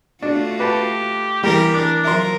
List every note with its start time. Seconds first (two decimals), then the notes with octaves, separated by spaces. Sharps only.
0.22 A3 D4 F4 F#4
0.60 G4 B4 A5
1.44 E3 G3 G4 A#4
1.74 D4 D6
2.04 F3 F#3 A#4 E5 C6